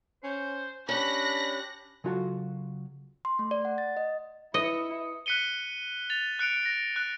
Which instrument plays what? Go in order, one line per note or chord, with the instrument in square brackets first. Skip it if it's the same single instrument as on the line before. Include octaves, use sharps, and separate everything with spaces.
[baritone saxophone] C#4 [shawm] C5
[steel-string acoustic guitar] C#4 G4 [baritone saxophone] D4 [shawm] B5 [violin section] F#6 A#6
[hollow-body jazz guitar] C#3 F#3 F4 F#4 A4 A5
[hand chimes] C6
A3
D5
F#5
A6
D#5
[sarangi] E4 [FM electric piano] B4 D#6 C#7 [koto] D#5
[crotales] F#6 B6 C#7 D#7 G7
A6 F7
F#6 C#7 D7 F7
A#6
F#6